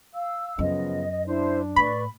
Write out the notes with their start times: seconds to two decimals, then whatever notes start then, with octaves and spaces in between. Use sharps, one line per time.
0.14 F5 E6
0.59 F#2 C#3 F3 B3 D#5
1.27 D4 E4 C5
1.76 A2 B4 D5 B5 C#6